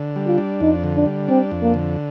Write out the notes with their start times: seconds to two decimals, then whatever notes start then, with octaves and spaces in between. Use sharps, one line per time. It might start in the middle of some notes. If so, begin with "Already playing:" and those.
Already playing: D3
0.16 G3
0.27 F4
0.38 D4
0.60 F2 D#4
0.84 D3
0.95 D4
1.06 G3
1.28 C4 D4
1.51 F2
1.62 A#3
1.74 D3